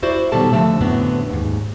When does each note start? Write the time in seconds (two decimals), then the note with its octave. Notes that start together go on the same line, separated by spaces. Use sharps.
0.03 E4 F#4 C5 D5
0.32 B2 D#3 F#3 G3 A4 A5
0.52 D3 F3 A3 E5
0.81 F#2 A2 D3 F#3 B3 C4
1.30 D#2 G#2